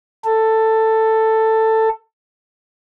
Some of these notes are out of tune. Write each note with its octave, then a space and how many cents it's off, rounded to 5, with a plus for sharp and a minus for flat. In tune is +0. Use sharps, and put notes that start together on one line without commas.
A4 +10